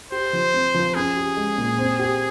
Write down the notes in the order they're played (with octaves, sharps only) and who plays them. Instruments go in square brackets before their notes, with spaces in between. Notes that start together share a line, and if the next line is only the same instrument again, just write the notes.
[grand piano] G4 [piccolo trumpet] C5
[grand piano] F3
C4
F3
[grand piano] C#4 [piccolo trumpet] G#4
[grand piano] G4
G#3
A#2
C4
G4